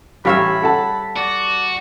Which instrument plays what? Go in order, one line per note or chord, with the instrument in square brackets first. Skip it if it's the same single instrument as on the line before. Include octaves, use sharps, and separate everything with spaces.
[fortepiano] A1 F5 [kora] G3 C#5 E5 [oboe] B5
[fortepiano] A4 F#5 A5
[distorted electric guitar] F#4 [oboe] D5